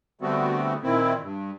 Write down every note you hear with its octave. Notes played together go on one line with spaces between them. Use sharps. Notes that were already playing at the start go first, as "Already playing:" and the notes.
D3 G3 A3 B3 C4 F#4
A#2 D#3 C4 E4
G2